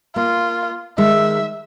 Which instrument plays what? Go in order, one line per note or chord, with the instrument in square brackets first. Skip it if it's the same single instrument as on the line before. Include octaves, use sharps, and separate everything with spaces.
[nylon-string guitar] A#3 [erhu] F4
[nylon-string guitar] D#3 G#3 [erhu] E5